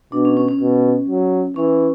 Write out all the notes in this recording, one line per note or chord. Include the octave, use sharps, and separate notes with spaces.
B2 D4
C#4
C#4
C#4
B2
F#3
E3 C#4